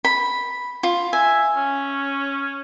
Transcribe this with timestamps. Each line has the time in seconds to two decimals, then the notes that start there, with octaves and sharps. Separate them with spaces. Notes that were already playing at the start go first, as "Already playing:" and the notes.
0.05 B5
0.83 F4
1.13 E5 G#5
1.56 C#4